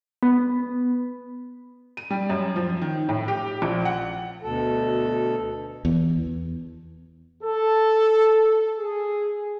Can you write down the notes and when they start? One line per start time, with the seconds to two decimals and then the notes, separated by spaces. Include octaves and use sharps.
0.23 B3
1.97 D#7
2.10 G3
2.30 F#2
2.56 F3
2.81 D#3
3.09 A2
3.28 G4
3.62 A#1
3.85 F#5
4.42 D2 B2 A4
5.85 E2
7.44 A4
8.79 G#4